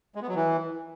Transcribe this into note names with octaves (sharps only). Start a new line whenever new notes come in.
G#3
B3
F#3
E3